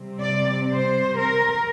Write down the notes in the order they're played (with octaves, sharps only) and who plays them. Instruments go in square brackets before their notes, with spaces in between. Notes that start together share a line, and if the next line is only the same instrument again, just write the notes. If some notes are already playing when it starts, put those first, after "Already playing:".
Already playing: [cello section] C3 G3 C4
D5
C5
A#4